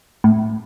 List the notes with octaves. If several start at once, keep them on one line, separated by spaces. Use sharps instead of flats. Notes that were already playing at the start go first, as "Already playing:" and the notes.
A2